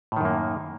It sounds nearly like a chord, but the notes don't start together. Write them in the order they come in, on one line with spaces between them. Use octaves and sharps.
A2 D#3 F#2 A#3